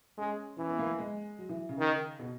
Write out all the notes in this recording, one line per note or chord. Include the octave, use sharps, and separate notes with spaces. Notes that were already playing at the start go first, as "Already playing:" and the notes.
G#3 C#4
E3 C#4
B3
A#3
G#3
F#3
E3
C#3
D#3
B2